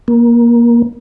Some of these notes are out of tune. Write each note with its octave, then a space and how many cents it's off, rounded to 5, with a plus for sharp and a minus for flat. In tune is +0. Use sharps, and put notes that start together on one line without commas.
A#3 +20